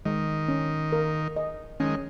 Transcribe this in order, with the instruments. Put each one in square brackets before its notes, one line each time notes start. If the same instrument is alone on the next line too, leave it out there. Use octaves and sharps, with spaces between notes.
[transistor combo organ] D#3 [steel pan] G#3
[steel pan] C#4
A#4
D#5
[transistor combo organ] D#3 G#3 [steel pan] C#4